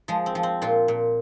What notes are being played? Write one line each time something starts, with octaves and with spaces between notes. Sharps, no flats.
F3 G#3
C4
F3
C4
A#2 F4
A#2